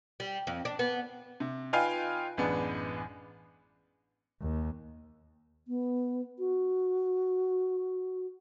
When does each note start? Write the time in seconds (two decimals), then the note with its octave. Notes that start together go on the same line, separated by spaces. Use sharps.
0.20 G3
0.47 F2
0.65 D4
0.79 B3
1.40 C3
1.73 D#4 F4 B4 F5 G5 G#5
2.37 A1 F#2 G#3 B3 D4
4.41 D#2
5.68 B3
6.39 F#4